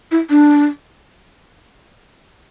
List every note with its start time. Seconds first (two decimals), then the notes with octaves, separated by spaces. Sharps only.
0.11 E4
0.30 D4